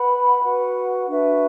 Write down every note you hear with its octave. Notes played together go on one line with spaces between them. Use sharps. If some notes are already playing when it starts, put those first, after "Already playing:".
Already playing: B4 F#5 B5
F#4 B4 F#5
D4 F#4 B4 E5